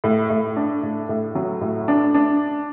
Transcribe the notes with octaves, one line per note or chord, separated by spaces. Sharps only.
A2
A2
D4
A2
A2
F#3
A2
D4
D4